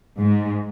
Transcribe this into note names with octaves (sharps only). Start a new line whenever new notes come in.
G#2